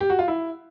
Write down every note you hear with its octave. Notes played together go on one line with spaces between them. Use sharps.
G4
F#4
F4
E4